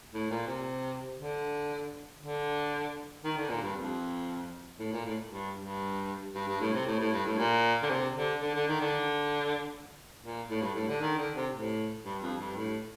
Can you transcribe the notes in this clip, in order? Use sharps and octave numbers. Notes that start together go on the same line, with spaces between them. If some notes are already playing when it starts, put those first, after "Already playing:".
A2
A#2
C3
D3
D3
D#3
D3
A#2
G2
F2
A2
A#2
A2
G2
G2
G2
G2
A2
C3
A2
A2
G2
A2
A#2
D3
C3
D3
D3
D3
D#3
D3
A#2
A2
G2
A2
D3
D#3
D3
C3
A2
G2
F2
G2
A2